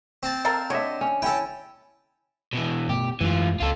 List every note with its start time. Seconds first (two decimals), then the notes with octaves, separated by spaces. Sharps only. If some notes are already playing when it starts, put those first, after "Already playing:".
0.23 C4 A5
0.45 A4 A#4 F5
0.70 D3 C#5 D#5 E5
1.01 C#4
1.22 C#4 E4 A4 G5
2.53 B2 E3
2.89 B2 A3 B3 G4
3.21 F#2 E3 G#3 A3 F4
3.60 C#2 F4 A4